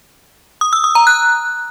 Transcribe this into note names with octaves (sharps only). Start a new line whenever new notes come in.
D#6
E6
D#6
A#5
F#6